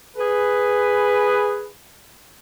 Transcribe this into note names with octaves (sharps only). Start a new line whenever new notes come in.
G#4 B4